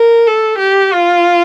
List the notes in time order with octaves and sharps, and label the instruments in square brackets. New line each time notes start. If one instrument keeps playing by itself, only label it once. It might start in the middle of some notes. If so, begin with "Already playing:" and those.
Already playing: [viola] A#4
A4
G4
F4